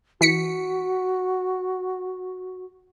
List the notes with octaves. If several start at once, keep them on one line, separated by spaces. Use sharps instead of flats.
E3 F#4 B6 C#7